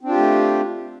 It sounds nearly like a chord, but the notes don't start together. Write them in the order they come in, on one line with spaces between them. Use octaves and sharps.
C4 D4 F4 G4 A3